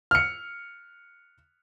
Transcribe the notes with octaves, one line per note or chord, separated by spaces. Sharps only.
F6 C#7